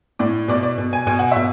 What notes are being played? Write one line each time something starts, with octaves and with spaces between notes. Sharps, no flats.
A2 D5
B2 D5
D5
B2
G#5
B2 G#5
F#5
B2 E5